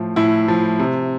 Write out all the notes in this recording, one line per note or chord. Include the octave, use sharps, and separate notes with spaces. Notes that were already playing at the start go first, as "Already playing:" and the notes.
Already playing: A2 F3
A2 E4
F3
C3